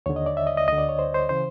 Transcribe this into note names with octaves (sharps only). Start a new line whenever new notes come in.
D#2 D3 C#5
D#5
D5
E5
D#5
D#5
D2 D3 D#5
D5
C#5
C5
C5
C#3 E3 C5